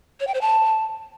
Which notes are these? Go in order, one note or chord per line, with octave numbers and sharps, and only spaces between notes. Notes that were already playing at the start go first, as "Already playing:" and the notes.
C#5
G5
C5
A5